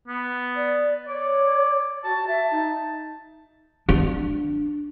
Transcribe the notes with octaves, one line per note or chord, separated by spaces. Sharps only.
B3
D5
C#5 D5
F#4 A5
E5 A5
D#4
D4